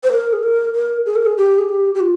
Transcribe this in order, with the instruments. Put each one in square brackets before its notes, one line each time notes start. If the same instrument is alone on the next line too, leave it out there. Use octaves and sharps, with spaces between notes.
[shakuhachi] C5
A#4
G#4
A#4
A#4
G#4
A#4
G#4
G4
G#4
G4
G4
F4